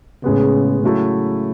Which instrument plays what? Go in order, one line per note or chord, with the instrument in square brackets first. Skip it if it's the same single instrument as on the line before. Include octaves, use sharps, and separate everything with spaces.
[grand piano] A2 G#3 B3 [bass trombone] C#3
[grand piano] C#3 F#3 A3 E4 A4